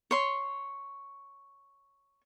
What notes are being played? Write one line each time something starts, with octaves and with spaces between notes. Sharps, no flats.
C#5 C6